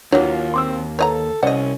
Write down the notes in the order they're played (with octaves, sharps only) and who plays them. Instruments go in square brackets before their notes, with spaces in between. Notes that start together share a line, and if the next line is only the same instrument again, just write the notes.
[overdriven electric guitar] D#2 [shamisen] E3 F#3 [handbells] D4 C#5 [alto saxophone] F4
[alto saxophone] C4 [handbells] C6 D6 E6
[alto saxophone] A4 [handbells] B4 [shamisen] C#5 D#5 A#5
[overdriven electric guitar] C2 [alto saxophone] C#4 [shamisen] C5 D#5 [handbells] D5 F#5